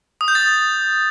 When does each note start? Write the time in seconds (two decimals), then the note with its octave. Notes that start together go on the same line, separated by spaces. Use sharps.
0.21 D#6
0.28 G6
0.35 A6